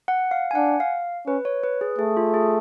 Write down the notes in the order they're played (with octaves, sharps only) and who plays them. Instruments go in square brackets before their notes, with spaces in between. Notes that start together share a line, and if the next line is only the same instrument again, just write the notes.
[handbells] F#5
F5
G#5
[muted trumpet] D4 [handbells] F#5
[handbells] F5
[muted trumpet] C#4 [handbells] B4
[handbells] C#5
B4
G#4
[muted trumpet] A3 [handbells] G#4
[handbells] F4
G#4